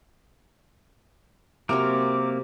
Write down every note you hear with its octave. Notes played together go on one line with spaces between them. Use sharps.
C3 F#3 A#3 C4 C#4 A#4 D6